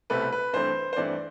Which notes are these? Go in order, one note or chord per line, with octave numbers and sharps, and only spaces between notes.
C2 B2 A3 C4 B4
B4
G2 E3 A3 C4 C5
C5
G2 E3 A3 C4 D5